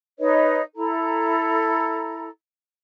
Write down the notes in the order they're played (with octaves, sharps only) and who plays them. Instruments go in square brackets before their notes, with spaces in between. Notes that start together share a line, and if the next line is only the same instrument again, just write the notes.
[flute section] D#4 B4 C#5 D#5
E4 A4 A#5